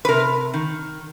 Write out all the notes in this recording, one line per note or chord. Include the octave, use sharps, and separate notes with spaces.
B4
C3 A#4
D#3